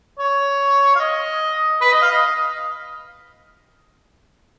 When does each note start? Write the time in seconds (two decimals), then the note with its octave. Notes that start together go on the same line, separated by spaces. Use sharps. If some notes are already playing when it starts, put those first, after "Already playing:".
0.19 C#5
0.96 F5
0.99 D#5
1.81 B4
1.92 D#5
2.02 F5
2.12 D#5